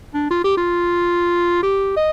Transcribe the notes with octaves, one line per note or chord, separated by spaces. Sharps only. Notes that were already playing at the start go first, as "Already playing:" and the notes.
D4
F4
G4
F4
G4
D#5